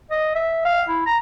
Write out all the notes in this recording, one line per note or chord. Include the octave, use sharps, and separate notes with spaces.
D#5
E5
F5
E4
A#5